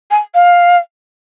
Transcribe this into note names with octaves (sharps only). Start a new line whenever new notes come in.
G#5
F5